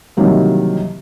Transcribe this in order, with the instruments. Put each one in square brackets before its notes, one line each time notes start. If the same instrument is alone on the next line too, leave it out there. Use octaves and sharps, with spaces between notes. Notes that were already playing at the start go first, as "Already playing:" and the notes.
[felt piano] C3 D#3 E3 F#3 G3 A#3